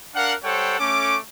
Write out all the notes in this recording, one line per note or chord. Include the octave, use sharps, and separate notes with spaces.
D4 A#4 F5 F#5
G3 A4 C5 C#5 F#5 G5
A3 C#4 D6